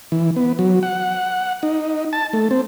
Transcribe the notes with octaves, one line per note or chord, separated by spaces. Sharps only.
E3
B3
F#3
F#5
D#4
A5
A3
C4